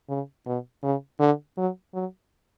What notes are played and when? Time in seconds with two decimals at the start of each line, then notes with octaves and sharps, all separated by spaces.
0.09 C#3
0.46 B2
0.83 C#3
1.20 D3
1.57 F#3
1.94 F#3